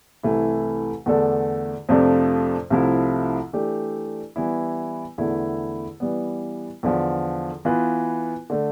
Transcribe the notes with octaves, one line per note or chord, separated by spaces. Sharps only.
C2 C3 E3 A3 E4
E2 D3 A3 D4 A4
F2 C3 F3 A3 D4
C2 C3 F3 A3 E4
E3 A3 D4 G4
E3 G3 B3 E4
E2 D3 A3 E4
E3 G3 B3
E2 D3 F3
E3 B3 F4 B4
D3 A3